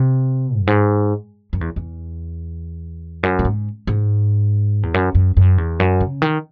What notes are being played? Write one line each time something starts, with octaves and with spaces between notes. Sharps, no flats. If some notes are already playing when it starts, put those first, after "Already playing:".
Already playing: C3
F#2
G#2
F#2
E2
E2
F#2
A2
G#2
G#2
E2
F#2
F#2
F#2
E2
F#2
C#3
D#3